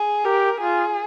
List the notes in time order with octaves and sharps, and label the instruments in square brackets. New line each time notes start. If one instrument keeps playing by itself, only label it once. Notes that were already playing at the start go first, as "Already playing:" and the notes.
Already playing: [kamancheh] G#4
[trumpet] G4 [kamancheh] A#4
[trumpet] F4 [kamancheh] G#4